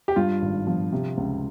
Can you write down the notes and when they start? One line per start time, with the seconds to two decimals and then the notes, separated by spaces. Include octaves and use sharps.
0.08 G4
0.16 G2 F4
0.42 G#1
0.67 F3
0.92 C3
1.17 C#2